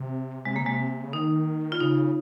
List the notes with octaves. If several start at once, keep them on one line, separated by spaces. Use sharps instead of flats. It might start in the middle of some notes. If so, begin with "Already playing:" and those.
Already playing: C3
C3 G#3
C#3 A#3
C3 G#3
C#3
D#3 D#4
F4
C#3 D#4